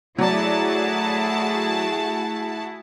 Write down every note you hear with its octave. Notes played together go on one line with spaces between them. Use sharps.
F#3 A3 E4 F#4 G#4 D5 A5